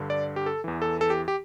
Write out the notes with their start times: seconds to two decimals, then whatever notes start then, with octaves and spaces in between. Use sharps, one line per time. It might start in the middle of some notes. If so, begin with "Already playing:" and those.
Already playing: G2 D3
0.10 D5
0.36 G4
0.46 A4
0.64 E2 E3
0.82 A4
1.01 A4
1.10 G4
1.28 G4